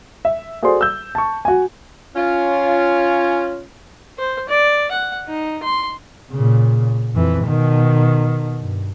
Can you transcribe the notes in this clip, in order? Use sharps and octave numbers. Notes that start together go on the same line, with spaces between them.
E5
F#4 G#4 A4 C5 D5 C6
E6 G6
A5 C#6
F#4 G#5
C#4 F4
C5
D5
F#5
D#4
C6
A#2 C#3
F2 E3
B2 D#3
G2